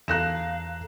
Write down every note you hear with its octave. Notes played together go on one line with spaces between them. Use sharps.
E2 A4 F5 A#5 F#6 A#6 E7